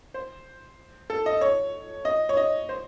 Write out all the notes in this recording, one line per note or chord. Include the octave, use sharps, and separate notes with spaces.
C5
A4
D#5
C#5
D#5
C#5
D#5
C5